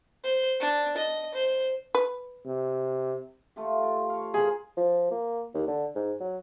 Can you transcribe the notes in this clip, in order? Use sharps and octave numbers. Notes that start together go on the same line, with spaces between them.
C5
D4
D#5
C5
B4
C3
A3 F4 G4
F4 G5
C#5 F5
G#4 A#4 C5 B5
F3
A#3
D#2
D3
G#2
F#3